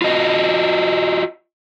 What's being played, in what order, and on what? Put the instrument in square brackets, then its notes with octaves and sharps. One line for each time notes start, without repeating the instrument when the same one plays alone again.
[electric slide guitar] F4 F#4 D#5